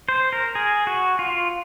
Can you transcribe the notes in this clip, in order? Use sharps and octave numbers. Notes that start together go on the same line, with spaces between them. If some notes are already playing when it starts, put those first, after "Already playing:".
C5
A#4
G#4
F#4
F4